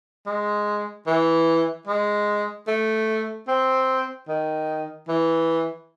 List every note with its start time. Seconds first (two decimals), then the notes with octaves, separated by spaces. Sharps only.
0.26 G#3
1.07 E3
1.87 G#3
2.68 A3
3.48 C4
4.28 D#3
5.08 E3